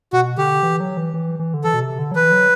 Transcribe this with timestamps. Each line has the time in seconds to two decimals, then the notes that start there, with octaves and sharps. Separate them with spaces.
0.13 B2 F#4
0.37 D3 G4
0.63 E3
0.80 F#3
0.97 E3
1.14 E3
1.39 E3
1.54 D3
1.64 E3 A4
1.74 B2
1.82 C3
1.99 D3
2.11 F#3
2.15 E3 B4
2.32 F#3